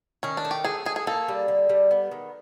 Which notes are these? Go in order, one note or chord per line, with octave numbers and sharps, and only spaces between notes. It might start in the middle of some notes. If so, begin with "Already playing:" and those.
D#3 C#4
D4
A3
G4
A3 G#4
A3 G#4
G#4
A#3 A4
G3
D3
G3
B3
D#3